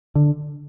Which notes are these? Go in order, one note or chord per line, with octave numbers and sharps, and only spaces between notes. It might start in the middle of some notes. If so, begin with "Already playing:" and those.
D3